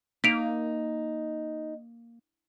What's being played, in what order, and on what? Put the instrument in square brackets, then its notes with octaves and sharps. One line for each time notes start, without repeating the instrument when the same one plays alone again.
[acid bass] A#3 [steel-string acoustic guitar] D#4 [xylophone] B6 D7 F7